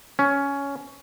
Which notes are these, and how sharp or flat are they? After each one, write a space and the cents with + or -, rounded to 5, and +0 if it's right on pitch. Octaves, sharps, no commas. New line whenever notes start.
C#4 +10